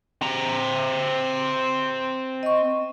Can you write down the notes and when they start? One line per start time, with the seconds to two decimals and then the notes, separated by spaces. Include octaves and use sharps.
0.22 C4 A#5
2.43 D#5 C#6